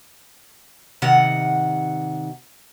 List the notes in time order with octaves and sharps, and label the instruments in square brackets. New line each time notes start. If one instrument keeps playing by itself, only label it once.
[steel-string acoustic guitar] C3 D#3 F#5